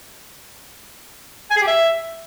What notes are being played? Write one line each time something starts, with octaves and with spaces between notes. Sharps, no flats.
G#5
G#4
G4
E5